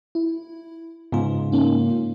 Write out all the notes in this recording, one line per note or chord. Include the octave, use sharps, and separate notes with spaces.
E4
G#2 C#3 B3 F4
A#3 C#4 D#4